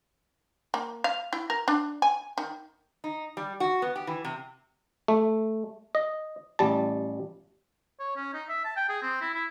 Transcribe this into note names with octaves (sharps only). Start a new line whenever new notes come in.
A#3
F5
E4
A#4
D4
G#5
D#3
D#4
G3
F#4
B3
G4
E3
C3
A3
D#5
A1 G3 A5
C#5
C#4
D#4
E5
A5
G5
G#4
C4
E4
E4